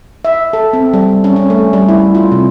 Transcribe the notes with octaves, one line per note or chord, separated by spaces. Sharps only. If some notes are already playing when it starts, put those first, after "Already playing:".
E5
A4
C4
G3
C#4
C#4
A3
G3
E4
F4
C3